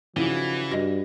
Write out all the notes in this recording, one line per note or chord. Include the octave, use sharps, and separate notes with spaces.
C#3 E3 F3 D#4 E4 F#4
G2 F#4 D#5 A#6